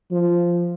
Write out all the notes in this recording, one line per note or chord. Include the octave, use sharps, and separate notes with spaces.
F3